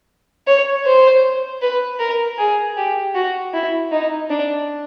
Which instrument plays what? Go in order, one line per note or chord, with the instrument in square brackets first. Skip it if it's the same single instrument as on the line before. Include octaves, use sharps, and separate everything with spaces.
[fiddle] C#5
C5
B4
A#4
G#4
G4
F#4
E4
D#4
D4